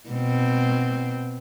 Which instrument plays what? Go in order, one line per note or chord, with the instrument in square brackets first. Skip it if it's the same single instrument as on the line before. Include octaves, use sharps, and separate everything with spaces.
[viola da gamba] B2 C4